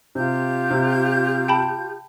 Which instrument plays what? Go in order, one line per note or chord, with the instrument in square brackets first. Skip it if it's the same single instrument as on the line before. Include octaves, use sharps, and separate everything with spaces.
[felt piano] C3 [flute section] F4 G4 G6
[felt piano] C3
[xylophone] G5 A5 B5